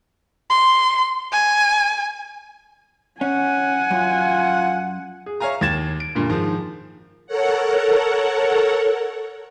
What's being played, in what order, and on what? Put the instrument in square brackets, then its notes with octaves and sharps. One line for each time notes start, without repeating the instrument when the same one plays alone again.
[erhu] C6
G#5
[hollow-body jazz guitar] C#4 [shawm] F#5 [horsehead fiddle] G#5
[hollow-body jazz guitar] F#2 [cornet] F4
[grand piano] G#4
C#5 E5 F5 G#5 A#5
D#2 G#6 A6 E7
D7
G2 A#2 D3
G#2 D#3 F3
[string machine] A4 A#4 C#5 F#5